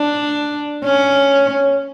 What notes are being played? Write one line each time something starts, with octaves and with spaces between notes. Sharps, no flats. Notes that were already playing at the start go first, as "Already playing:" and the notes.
Already playing: D4
C#4